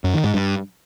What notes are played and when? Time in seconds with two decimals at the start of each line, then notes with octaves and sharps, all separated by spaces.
0.04 F#2
0.14 D#3
0.24 G#2
0.34 G2